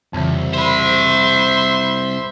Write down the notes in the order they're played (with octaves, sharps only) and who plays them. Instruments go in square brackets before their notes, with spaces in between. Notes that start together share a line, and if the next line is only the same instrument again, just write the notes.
[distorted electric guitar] C2 [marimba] F2 C#3 E3
[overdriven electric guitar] C5 B5 [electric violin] E5 C6